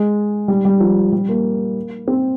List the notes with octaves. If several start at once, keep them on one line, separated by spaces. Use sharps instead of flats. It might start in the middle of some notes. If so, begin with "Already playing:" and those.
Already playing: G#3
G3
G3
F3
G3
A#3
C4